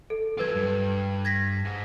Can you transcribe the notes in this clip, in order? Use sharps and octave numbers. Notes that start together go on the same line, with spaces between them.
A4
F#3 F4 A4 B4 G#6
G2
G#6 A#6 B6
G#2